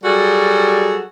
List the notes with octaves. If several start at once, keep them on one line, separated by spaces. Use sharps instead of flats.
F#3 G3 F#4 G#4 A4